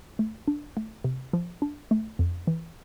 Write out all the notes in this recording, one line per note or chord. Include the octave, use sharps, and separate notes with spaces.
A3
D4
A3
C3
F3
D4
A3
F2
E3